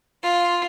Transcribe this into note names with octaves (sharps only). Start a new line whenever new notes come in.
F4